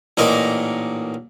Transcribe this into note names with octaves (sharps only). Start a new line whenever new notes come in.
A1 A#2 D#4 A#4